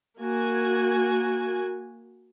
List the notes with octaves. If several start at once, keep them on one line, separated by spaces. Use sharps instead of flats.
A#3 F#4 G#5